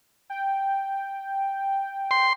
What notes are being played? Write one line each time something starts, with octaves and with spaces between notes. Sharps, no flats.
G5
C6